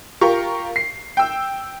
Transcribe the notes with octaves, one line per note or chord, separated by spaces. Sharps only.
F4 G4 A#4 C#6
C7
G5 E6